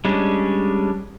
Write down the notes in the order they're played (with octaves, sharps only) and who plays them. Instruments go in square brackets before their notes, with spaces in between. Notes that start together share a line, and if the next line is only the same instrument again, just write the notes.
[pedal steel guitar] G3 G#3 C#4 D4